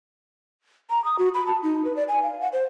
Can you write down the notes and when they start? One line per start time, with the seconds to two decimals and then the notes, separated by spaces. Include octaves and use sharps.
0.90 A#5
1.05 D#6
1.19 F#4
1.34 B5
1.47 A5
1.63 D#4
1.85 B4
1.96 D5
2.08 G#5
2.23 F5
2.41 F#5
2.53 C5